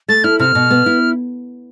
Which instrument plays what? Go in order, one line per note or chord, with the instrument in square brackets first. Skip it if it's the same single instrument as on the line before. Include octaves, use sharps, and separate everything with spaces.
[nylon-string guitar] A3 [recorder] A6
[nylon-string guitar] E4 [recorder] F6
[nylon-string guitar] C3 [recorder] F6
[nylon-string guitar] B2
B3
E4